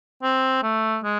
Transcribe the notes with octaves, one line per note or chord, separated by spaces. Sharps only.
C4
A3
G#3